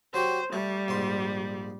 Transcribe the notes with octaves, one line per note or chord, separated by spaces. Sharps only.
F#3 F#4 G4 C5
G3 A3
A#1 G#2 C6